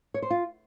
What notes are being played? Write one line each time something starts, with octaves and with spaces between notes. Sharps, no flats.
C#5
C5
F4